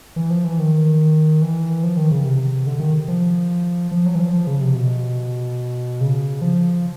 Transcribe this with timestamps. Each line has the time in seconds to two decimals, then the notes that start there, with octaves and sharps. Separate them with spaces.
0.16 E3
0.30 F3
0.44 E3
0.59 D#3
1.42 E3
1.83 F3
1.97 D#3
2.11 C#3
2.25 C3
2.67 D3
2.80 D#3
3.08 F3
3.91 F3
4.06 F#3
4.15 E3
4.20 F3
4.33 F3
4.47 C#3
4.61 C3
4.75 B2
6.01 C#3
6.42 F3